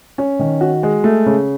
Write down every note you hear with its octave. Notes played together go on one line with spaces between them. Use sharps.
C#4
D#3
F#4
G#3
A3
C#3